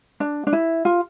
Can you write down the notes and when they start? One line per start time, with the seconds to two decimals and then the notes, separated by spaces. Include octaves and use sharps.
0.20 D4
0.47 D4
0.53 E4
0.85 F4